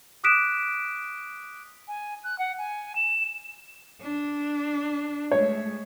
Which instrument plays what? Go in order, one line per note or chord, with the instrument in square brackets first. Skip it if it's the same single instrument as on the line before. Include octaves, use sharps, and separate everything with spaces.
[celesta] D6 D#6 F#6 B6 D7 E7
[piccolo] G#5
F#6
F#5
G#5
E7
[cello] D4
[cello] G#3 A3 [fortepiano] C#5